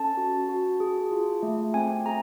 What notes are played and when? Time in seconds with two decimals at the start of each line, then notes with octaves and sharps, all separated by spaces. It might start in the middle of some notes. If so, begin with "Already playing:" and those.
Already playing: C#4 A4 A5
0.17 F#4
0.49 F#4
0.80 G#4
1.11 F4
1.43 A3
1.74 C4 G#5
2.06 G#4 A#5